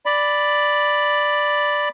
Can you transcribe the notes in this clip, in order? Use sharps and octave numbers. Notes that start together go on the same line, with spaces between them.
D5 B5